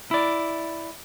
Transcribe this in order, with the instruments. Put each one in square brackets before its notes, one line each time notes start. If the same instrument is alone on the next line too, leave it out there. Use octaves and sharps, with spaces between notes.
[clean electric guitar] E4 D5